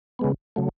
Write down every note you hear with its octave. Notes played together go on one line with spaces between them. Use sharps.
C#3 G#3 B3
C#3 F#3 A3